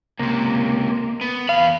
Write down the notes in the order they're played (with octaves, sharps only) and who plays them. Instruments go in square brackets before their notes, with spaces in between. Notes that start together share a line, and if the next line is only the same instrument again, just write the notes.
[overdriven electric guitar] C#2 C3 [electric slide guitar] A#3
[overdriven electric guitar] B3
[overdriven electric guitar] E2 B5 [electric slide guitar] F5